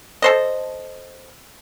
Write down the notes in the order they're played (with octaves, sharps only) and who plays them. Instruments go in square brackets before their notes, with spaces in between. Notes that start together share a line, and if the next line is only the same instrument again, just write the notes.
[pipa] A4 C5 D#5